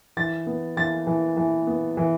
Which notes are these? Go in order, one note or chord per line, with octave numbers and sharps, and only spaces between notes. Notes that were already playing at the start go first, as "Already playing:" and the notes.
E3 A6
B3
E3 A6
E3
E3
B3
E3